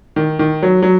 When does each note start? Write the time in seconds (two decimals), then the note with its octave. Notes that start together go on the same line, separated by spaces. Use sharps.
0.16 D#3
0.39 D#3
0.62 F#3
0.82 F#3